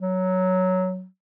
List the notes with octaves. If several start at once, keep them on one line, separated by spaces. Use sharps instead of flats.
F#3